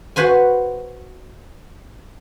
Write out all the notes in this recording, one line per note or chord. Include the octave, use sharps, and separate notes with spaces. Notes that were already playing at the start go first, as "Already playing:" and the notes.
F#4 B4 C5 G#5